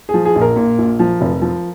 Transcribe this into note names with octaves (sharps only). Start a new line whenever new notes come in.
G#4
F3
G#4
A#1
A#4
A#2
A#1
F3
F1
F3